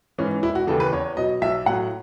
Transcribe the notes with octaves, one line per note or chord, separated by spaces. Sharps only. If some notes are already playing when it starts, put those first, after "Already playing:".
G#2 E3 C#4
E1 E4
F#4
D#2 C#3 E3 A4
B4
E2 C#5
B2 F#3 D#5
B1 E5
A2 F#3 F#5